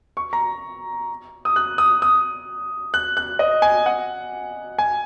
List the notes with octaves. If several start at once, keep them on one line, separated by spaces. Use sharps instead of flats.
C#6
A#5
D#6
F#6
D#6
D#6
F#6
F#6
D#5
G#5
F#5
G#5